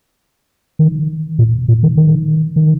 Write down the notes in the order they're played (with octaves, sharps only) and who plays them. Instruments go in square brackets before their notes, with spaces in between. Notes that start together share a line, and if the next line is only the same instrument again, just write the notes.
[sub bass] D#3
A#2
A#2
D#3
D#3
D#3